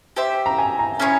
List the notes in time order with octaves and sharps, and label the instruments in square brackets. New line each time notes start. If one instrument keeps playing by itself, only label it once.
[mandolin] G4 C5 E5
[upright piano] A#5
G#5
A#5
[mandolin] C#4 E4 G#4 C#5